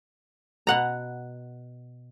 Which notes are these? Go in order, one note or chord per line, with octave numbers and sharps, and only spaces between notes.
B2 F#5 A#5